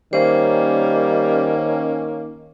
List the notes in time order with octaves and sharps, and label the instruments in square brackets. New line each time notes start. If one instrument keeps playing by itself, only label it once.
[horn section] D#3 A#3 C#4 [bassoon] G3 [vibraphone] C5